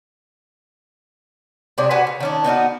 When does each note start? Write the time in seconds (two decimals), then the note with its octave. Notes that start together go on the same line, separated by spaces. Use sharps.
1.78 C3 G#3 D4 C#5
1.91 F#4 B4 F#5 G#5
2.07 C#3
2.20 D#3 C#4 D4
2.44 B3 D#4 F#4 A#4